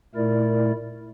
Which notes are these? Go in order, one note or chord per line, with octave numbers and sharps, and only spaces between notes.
A#2 A3 E4 A#4 D5